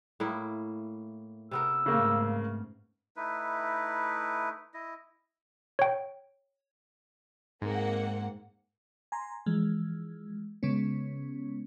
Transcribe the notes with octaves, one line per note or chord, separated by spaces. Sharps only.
A2 A#3 E4
C3 B3 A#4 E6
G#2 C#3 A3 A#3
A3 D#4 E4 B4
E4 D#5
C#5 G5
G#2 A#3 C4 F#5
G#5 A#5 C6
E3 F3 G#3
C#3 G#3 B3 C#4